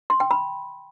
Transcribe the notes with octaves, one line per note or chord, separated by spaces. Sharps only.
C6
G5
B5